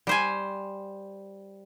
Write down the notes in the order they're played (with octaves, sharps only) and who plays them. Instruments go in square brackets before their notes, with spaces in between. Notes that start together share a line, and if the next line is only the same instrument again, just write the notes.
[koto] G3 C5 G#5